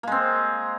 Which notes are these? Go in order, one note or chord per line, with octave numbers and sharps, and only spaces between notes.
G#3 A#3 C4